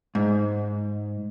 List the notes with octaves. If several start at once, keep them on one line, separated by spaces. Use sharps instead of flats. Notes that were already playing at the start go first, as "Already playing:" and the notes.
G#2